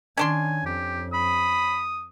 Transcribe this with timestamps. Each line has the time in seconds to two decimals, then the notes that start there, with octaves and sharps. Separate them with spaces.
0.17 D#3 C#4 D4 G#5 C6
0.66 F2 G4
1.14 B5 D#6